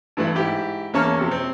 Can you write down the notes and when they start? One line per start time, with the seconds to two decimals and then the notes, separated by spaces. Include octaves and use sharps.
0.17 G2 E3 A3 E4
0.34 G#2 E4 G4
0.93 E2 A#3 C#4 C#5 A5 F6
1.18 C3 F3
1.31 C4